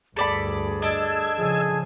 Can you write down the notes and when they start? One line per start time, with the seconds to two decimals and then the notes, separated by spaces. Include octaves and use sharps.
0.16 D2 G2 G#4 A4 D5 B5
0.82 D4 A4 D#5 E6 G#6
1.37 C#3 F3 G#4